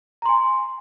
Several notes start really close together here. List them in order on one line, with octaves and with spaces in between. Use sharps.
A#5 C6 G#5